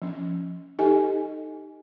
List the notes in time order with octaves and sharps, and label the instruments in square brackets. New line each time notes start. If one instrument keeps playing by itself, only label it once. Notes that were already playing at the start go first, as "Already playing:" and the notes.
[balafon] F3 C#4
D#4 G4 A4 D#5 G#5